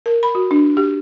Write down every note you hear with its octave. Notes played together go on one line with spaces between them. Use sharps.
A#4
B5
F#4
D4
G4